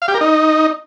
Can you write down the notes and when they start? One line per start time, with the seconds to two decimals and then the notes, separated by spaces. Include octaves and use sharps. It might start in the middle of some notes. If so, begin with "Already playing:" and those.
0.02 F5
0.08 G4
0.14 A#4
0.21 D#4